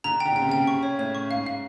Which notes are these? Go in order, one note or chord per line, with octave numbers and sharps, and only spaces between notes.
D3 A#5
G5
D3
C#3 G5
C3
C#3 G5
C#6
C#5
A2 C#5
C#6
G#2 F5
F5